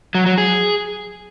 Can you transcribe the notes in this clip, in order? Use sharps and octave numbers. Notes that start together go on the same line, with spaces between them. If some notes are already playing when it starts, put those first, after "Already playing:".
F#3
F#3
G#4